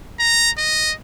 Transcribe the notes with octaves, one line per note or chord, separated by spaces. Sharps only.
A#5
D#5